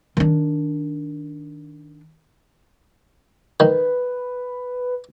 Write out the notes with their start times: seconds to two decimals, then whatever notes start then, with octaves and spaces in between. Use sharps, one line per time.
0.17 D#3 D4
3.60 D#3 B4